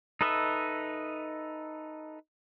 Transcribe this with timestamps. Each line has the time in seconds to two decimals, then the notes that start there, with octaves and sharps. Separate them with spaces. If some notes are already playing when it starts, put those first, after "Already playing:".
0.21 D#4 A4 B4 D#5 E5